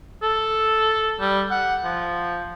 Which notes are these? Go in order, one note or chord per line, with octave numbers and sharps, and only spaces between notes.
A4
G3
F#5
F3